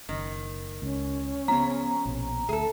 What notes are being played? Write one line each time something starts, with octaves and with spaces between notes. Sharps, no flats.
F#1 D#3
C#2 C#4
C#3 F3 B3 C4 A#5
A#1 B2
D2 G#4 A4 E5